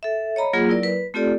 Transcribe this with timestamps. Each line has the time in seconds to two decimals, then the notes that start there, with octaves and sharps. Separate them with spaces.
0.03 A4 E5
0.36 C#5 D#5 A#5 B5
0.53 F#3 A#3 F4 G#4
0.68 F#3 E4 A#4 D5
0.83 B4
1.14 A3 C4 F4 G4 A4 D5